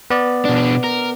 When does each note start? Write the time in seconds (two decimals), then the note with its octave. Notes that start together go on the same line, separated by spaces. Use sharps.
0.10 B3 D5
0.45 B2 D4
0.84 A#4